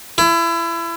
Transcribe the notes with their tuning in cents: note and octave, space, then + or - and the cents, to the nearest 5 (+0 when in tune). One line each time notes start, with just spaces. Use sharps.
E4 +30